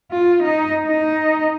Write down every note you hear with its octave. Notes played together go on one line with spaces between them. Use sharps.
F4
D#4
D#4